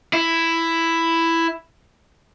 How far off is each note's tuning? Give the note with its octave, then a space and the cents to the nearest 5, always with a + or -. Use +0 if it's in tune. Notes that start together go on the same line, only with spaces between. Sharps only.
E4 +5